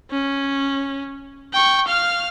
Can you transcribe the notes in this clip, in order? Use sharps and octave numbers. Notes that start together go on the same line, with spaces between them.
C#4
G5 C#6
F5 F6